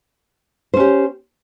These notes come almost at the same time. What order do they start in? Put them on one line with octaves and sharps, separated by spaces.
C5 C#4 G4